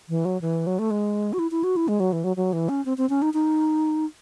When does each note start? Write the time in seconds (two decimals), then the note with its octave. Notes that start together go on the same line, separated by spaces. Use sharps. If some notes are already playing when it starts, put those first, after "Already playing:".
0.09 E3
0.25 F#3
0.41 E3
0.67 F#3
0.79 A3
0.91 G#3
1.33 F#4
1.39 E4
1.51 E4
1.64 F#4
1.76 E4
1.88 G#3
2.00 F#3
2.13 E3
2.24 F#3
2.36 F#3
2.53 E3
2.69 C#4
2.85 C4
2.98 C4
3.09 C#4
3.22 D#4
3.34 D#4